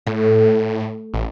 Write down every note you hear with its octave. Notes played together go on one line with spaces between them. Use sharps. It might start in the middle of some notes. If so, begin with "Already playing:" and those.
A2 A3
A1